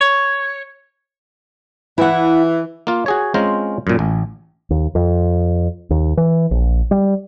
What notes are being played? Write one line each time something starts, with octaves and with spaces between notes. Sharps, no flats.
C#5
E3 E4 F#5
A#3 F4
F#4 G#4 C#5
G#3 C4 C#4 F4 C5 A#5
F#2 A#2
A1
D#2
F2
D#2
E3
A#1
G3